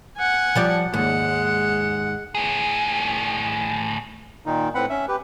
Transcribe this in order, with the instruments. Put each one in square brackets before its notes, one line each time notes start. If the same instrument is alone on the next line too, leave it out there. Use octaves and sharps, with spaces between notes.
[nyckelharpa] F#5 G#5
[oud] F3 G3 D5
[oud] D#2 G#2 [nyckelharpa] G#3 F#5
[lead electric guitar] A2 G#4
[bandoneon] A#2 D#3 D#4
A2 C4 B4 F#5 B5
C#4 E5
G4 B4